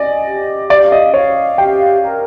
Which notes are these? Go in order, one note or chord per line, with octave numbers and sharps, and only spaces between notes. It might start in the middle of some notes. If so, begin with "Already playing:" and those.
Already playing: D5 D#5 G#5
G4
D5 F5
D#5
C#5 F5
G4 G5
A#4